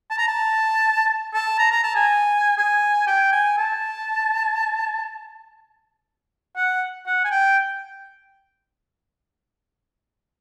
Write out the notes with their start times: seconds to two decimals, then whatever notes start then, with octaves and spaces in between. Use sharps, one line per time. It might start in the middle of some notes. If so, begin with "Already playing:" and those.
0.10 A5
0.18 A#5
0.27 A5
1.34 A5
1.59 A#5
1.71 A#5
1.83 A5
1.95 G#5
2.57 G#5
3.07 G5
3.32 G#5
3.57 A5
6.56 F#5
7.06 F#5
7.24 G#5
7.31 G5